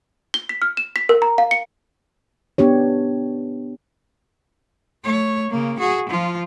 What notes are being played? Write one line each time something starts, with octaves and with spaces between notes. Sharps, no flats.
G7
B6
F6
E7
B6
A#4
A#5
F5
C#7
B3 D4 G4 C#5
A3 C#5
C#3 A#3
F#4 G#4
F3 F4